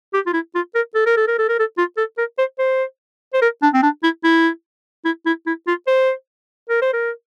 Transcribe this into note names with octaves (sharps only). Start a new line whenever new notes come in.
G4
F4
E4
F4
A#4
A4
A#4
A4
A#4
A4
A#4
A4
F4
A4
A#4
C5
C5
C5
A#4
D4
C4
D4
E4
E4
E4
E4
E4
F4
C5
A#4
C5
A#4